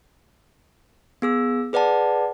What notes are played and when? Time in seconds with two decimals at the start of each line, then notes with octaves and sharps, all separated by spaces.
1.22 B3 G#4 E6
1.73 G#4 B4 D5 F#5 A5